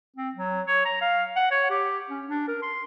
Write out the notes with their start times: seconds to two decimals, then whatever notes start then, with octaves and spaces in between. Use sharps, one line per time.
0.16 C4
0.35 F#3
0.67 C#5
0.85 A#5
1.01 F5
1.36 F#5
1.51 C#5
1.70 G4
2.10 C#4
2.27 D4
2.48 A#4
2.62 C6